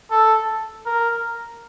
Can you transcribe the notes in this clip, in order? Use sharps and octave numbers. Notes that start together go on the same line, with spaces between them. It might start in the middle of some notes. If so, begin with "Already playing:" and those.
A4
A#4